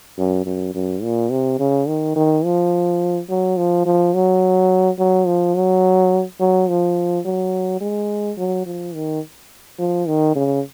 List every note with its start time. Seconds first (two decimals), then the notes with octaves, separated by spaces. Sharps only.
0.18 F#2
0.46 F#2
0.75 F#2
1.03 A#2
1.31 C3
1.60 C#3
1.88 D#3
2.16 D#3
2.44 F3
3.30 F#3
3.57 F3
3.86 F3
4.14 F#3
4.99 F#3
5.27 F3
5.55 F#3
6.40 F#3
6.69 F3
7.25 F#3
7.81 G#3
8.38 F#3
8.66 F3
8.95 D#3
9.79 F3
10.08 D#3
10.36 C#3